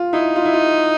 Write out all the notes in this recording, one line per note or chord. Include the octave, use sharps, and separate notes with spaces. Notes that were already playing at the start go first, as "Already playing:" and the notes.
Already playing: F4
D#4 E4
F4
E4
F4